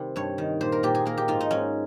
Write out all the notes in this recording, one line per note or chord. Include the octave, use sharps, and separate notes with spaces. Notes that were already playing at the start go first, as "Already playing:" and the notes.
Already playing: C3 D#3 G3
G2 C#5
D#3
A#2 C5
A#4
A#2 G4
G#4
A#3 A#4
G4
G#2 F4
D#4
G#2 C#4